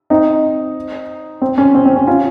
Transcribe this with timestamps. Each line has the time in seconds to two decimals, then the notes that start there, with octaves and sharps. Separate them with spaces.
0.10 C4 D#4
1.42 C4
1.58 C#4
1.75 C4
1.86 C4
1.96 C#4
2.07 C#4 F4